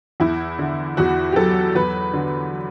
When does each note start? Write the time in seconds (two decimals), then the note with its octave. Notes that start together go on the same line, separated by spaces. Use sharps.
0.20 E2 E4
0.59 D3
0.97 E2 F#4
1.32 G4
1.36 F#3 A4
1.75 E2 B4
2.13 D3